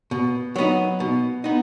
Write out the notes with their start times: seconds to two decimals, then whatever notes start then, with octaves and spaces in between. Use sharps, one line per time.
0.11 B2
0.56 F#3 B3 D#4
1.00 B2
1.44 B3 D#4